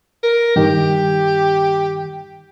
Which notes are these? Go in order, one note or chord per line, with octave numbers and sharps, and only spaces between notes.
A#4
G2 D#3 G4